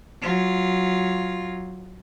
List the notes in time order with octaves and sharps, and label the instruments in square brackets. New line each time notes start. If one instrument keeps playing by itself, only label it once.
[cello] F#3 F4